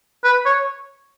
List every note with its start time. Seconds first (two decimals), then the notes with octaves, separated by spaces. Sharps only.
0.24 B4
0.46 C#5